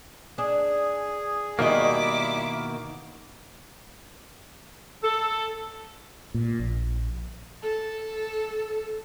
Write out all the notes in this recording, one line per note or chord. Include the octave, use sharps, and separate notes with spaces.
D4 G#4
B2 D#3 G3 A#3 E4 F#4 D#5 D6
A4
A#2
A#1
A4